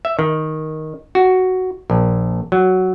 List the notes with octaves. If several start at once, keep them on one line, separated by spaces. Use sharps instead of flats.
E5
D#3
F#4
A#1
F#3